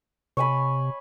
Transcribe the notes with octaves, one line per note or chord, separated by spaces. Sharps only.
C3 C#5 G#5 B5